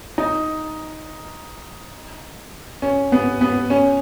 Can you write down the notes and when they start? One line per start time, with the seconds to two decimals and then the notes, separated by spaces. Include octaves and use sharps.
0.18 D#4
2.82 C#4
3.12 B3
3.41 B3
3.70 C#4